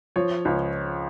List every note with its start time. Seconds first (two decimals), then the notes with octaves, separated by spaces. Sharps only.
0.16 F3 C#5
0.45 C#2